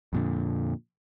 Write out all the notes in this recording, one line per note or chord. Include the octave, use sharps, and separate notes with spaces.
F2 A#2 D3